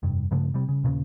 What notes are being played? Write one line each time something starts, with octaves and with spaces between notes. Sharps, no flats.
F1 G2
G2 C#3 F3 A3
C3 G3
C#3
D#2 A#2 C#3